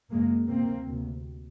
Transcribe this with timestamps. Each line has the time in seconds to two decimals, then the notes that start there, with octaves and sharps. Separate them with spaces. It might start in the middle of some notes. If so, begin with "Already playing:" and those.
0.10 F#2 C#3 G#3 A#3
0.49 D2 C3 A#3 C4
0.87 D2 C3